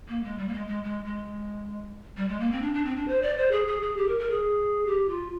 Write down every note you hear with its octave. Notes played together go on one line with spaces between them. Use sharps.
A#3
G#3
G3
A#3
G#3
G#3
G#3
G#3
G3
G#3
A#3
C4
D4
D4
C4
D4
C5
D5
C5
G#4
G#4
G#4
G4
A#4
A#4
G#4
G4
F4